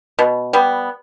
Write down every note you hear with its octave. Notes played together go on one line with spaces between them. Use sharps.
B2
G3 B3